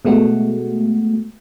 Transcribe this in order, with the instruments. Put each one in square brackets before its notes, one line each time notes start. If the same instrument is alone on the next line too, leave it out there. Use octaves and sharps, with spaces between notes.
[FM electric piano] B2 G#3 A3 F#4